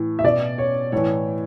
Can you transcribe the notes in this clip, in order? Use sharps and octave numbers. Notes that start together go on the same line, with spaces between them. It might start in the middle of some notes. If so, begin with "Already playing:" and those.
Already playing: A2 E3
E5
B2 D5
C#5
A2 E3 C#5